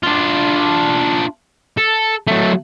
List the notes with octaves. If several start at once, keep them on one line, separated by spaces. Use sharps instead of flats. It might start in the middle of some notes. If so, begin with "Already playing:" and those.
D4 F4
A4
F#3 A3